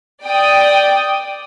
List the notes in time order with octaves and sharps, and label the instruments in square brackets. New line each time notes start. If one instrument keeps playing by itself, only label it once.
[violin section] D5 G5 D#6